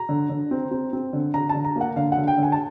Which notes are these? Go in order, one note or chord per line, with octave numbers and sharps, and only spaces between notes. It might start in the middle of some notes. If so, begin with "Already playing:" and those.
Already playing: A#5
D3
D3
C4
C4
C4
D3
D3 A#5
A5
D3
A#5
A#3
F#5
D3 F5
F#5
D3
G5
D3
G#5
A5